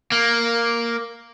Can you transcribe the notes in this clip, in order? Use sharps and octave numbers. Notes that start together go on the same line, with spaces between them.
A#3